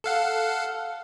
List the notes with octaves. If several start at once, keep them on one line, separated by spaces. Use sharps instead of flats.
A4 F5 F#5